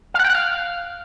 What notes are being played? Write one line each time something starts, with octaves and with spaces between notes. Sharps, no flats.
F5
F#5
G5
F#5
F5